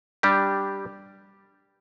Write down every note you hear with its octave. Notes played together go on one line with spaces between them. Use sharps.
G3 D4 G4